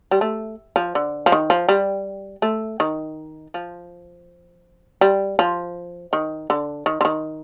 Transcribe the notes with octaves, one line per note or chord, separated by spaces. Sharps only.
G3
A3
F3
D3
F3
D#3
F3
G3
A3
D#3
F3
G3
F3
D#3
D3
D#3
D3
D#3